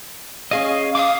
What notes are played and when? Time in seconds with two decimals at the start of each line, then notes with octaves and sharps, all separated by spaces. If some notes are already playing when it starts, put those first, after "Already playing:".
0.51 C#4 G#4 D#5 F5
0.95 F5 D6 D#6